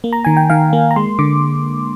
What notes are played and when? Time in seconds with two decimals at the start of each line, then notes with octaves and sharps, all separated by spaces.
0.04 A#3
0.13 A#5
0.25 D#3 G#5
0.37 G5
0.50 D#3 F5
0.73 A#3
0.91 A#5
0.96 G#3 C6
1.19 D3 D6